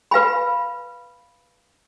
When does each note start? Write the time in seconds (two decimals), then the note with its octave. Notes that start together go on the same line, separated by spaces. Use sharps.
0.11 B4 F5 G#5 B5